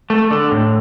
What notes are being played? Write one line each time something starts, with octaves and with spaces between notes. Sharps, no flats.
A3
D3
A2